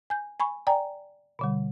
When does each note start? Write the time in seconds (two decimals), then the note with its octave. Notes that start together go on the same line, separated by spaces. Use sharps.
0.10 G#5 G6
0.40 G#5 B5 C#6
0.67 D5 G5 G#5 A#5
1.39 B2 D3 G3